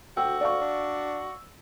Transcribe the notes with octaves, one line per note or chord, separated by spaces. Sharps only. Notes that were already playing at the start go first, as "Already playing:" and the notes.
D2 F#4 G5 E6
D5 F5 C#6
D4